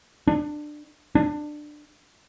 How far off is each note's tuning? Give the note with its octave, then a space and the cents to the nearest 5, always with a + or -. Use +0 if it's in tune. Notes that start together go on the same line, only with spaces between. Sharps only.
D4 +20
D4 +20